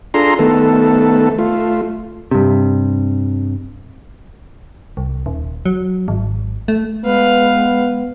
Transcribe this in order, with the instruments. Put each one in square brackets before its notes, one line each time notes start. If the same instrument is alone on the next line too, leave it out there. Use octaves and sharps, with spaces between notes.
[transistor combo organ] D4 F4 G#4 A4 A#5 C6
D#3 A3 B3 A4
A3 F4
[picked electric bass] G2 C3
[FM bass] C2
D#1
F#3
G#1
A3
[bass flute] G#3 [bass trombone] B3 [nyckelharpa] B4 F5